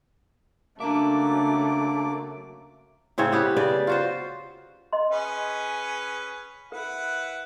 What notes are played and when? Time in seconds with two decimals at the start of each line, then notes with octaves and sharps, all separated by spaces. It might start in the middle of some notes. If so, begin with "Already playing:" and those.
0.80 C#3 F#3 A3 A#3 D4 E5 D6
3.18 A2 C#3 C4 C#5
3.32 B3 G4 B4
3.56 C#3 B4 D5 G5
3.87 F4 F#4 C5
4.93 D#5 C6
5.12 C#4 G#4 B4
6.72 E4 A#4 B4 F#5